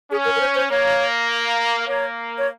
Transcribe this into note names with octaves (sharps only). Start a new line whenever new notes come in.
C#4 G#4
A#4
A#4
C5
C5
A#3 C#5
A#3 C#5
C#5